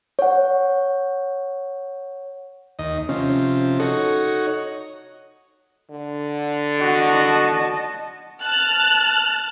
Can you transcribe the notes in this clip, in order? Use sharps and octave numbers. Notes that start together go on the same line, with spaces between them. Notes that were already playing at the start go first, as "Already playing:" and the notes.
C#5 F#5
D#2 D#5
C3 F3 C#4
D#4 F#4 A4 C#5
D3
F#4 D#5 A5
A5 F6 F#6